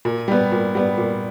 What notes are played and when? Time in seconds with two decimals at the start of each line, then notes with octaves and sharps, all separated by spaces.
0.05 A#2
0.28 G3 B3
0.52 A#2
0.75 G3 B3
0.98 A#2